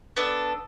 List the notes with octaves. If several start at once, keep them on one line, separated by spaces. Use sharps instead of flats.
B3 D4 A4